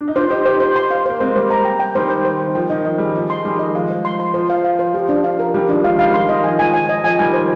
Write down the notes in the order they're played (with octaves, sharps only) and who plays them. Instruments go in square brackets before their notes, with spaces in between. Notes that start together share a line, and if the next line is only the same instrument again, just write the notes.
[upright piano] D4
D#4
[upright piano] D4 F4 [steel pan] C5
[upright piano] D#4 G4 [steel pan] C5
[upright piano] D#4 G4 [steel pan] C5
[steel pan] C5
C6
F5
[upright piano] A#3 [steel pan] C5
[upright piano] G#3 C4 [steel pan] C5
[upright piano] G3 A#3 [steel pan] C5
[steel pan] A#5
G5
G5
[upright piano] D#3 G3 [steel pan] C5
[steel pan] C5
C5
C5
[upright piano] D#3
[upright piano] F3 [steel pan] G5
[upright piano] D#3 [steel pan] D#5
[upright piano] F3 [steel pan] D#5
[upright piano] G3 [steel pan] G#4
[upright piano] F3 [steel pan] D#5
[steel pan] C6
[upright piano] D#3 G3 [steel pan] G#4
[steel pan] D#5
[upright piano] F3 G#3 [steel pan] F5
[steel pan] C5
C6
C6
[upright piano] F3 [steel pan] C5
[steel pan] F5
F5
C5
[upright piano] F3 [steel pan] G4
[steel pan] D4
F5
A#4
[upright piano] D#3 G3 [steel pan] G4
[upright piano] F3 G#3 [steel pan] D4
[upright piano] F3 G#3 [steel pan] F5
[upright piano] D#3 G3 [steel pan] F5
[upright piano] F3 [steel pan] C6
[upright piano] D#3 [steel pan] D#5
[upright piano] F3 [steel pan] G#5
[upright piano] F3 G#3 [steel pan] G#5
[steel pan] G#5
D#5
[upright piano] F3 [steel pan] G#5
[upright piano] D#3 G3 [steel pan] G#5
[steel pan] C5